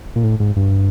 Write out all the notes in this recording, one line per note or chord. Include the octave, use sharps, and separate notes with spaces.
A#2
A2
G#2
G2